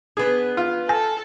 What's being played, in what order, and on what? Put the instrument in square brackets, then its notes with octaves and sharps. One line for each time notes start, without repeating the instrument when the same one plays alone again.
[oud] B3 D4 [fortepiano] G#4
[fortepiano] F4
[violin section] A4 [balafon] G#5